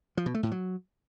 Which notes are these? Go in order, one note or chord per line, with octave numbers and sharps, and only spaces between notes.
F3
B2
A3
A2
F#3